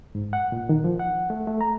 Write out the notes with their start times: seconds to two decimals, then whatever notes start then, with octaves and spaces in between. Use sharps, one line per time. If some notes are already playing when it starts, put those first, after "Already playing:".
0.15 G#2
0.33 F#5
0.52 A#2
0.69 D#3
0.84 F3
1.00 F#5
1.30 A3
1.47 A3
1.61 A#5